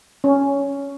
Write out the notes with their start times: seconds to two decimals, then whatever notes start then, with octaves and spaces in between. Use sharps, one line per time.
0.24 C#4